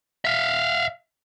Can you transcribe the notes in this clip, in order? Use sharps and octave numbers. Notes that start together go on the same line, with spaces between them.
E5 F5